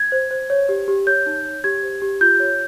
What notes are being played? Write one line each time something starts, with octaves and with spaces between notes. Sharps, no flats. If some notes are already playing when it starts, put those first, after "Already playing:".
Already playing: G#6
C5
C5
C#5
G4
G4
C#5 G6
D#4
C#5
G4 G#6
C5
G4
F4 G6
C#5